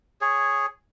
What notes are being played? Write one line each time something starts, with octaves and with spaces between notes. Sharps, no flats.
G#4 C#5